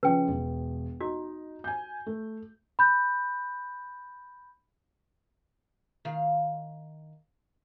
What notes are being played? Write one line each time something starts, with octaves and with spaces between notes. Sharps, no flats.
C#3 F3 C#4 B4 G5
E1
D#4 F#4
G#5 G6
A3
B5 G6
D#3 F5